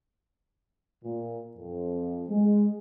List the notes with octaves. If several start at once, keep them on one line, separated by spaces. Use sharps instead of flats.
A#2
F2
G#3